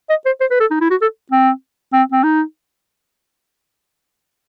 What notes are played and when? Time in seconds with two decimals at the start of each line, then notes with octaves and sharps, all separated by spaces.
0.10 D#5
0.26 C5
0.41 C5
0.51 B4
0.60 A4
0.71 D#4
0.81 E4
0.91 F#4
1.01 A4
1.31 C4
1.93 C4
2.12 C4
2.23 D#4